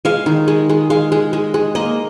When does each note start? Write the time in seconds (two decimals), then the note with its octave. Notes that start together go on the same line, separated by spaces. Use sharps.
0.05 G#3 F5
0.26 D#3
0.48 G#3
0.69 G#3
0.90 G#3 F5
1.12 G#3
1.33 G#3
1.54 G#3
1.75 A#3 D#5